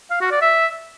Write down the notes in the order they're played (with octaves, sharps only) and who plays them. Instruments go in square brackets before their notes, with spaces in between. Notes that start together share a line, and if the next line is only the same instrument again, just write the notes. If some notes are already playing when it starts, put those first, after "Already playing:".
[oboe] F5
F#4
D5
E5